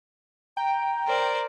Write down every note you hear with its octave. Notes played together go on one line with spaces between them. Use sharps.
G5 A#5
A#4 C5 D5